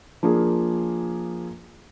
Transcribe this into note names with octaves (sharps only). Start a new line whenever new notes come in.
F3 A#3 D4 G#4